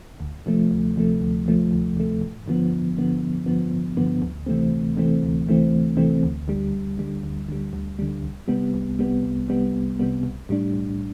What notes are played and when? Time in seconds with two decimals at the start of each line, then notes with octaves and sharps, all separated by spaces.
0.20 D2
0.46 C3 F3 A3
0.71 D2
0.96 C3 F3 A3
1.21 D2
1.46 C3 F3 A3
1.71 D2
1.96 C3 F3 A3
2.21 A1
2.46 G2 D3 F3 B3
2.72 A1
2.97 G2 D3 F3 B3
3.21 A1
3.46 G2 D3 F3 B3
3.71 A1
3.97 G2 D3 F3 B3
4.22 D2
4.46 C3 E3 A3 C4
4.72 D2
4.97 C3 E3 A3 C4
5.22 D2
5.47 C3 E3 A3 C4
5.72 D2
5.97 C3 E3 A3 C4
6.23 D2
6.48 D3 G3
6.72 D2
6.97 D3 G3
7.23 D2
7.48 D3 G3
7.73 D2
7.99 D3 G3
8.23 C2
8.48 C3 G3 B3
8.74 C2
8.99 C3 G3 B3
9.23 C2
9.48 C3 G3 B3
9.73 C2
9.99 C3 G3 B3
10.23 B1
10.49 A2 G3 D4
10.74 B1